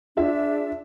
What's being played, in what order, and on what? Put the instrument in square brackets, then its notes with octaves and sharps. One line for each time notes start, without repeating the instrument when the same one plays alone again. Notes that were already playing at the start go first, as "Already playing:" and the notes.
[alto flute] D4 [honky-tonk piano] F4 G#4 E5